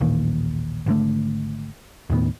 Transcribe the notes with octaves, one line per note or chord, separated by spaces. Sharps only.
A1 D#2 A#2 D#3
G#1 D3 A3
D#2 A2 D#3 B3